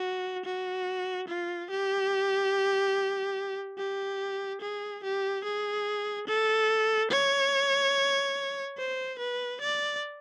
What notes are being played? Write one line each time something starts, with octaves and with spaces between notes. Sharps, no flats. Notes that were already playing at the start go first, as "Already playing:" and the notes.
Already playing: F#4
F#4
F4
G4
G4
G#4
G4
G#4
A4
C#5
C5
B4
D5